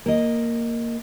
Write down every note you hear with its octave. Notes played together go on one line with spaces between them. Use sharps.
A#3 D#5